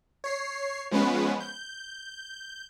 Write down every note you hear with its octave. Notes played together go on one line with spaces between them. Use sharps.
C#5 C7
F3 G#3 B3 C#4 B4
G6